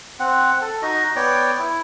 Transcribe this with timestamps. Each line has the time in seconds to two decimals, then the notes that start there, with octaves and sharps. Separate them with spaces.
0.20 C4 F#5
0.61 A4
0.82 D#4 F#4 D#5
1.16 B3 C#5 D5 G5
1.59 E4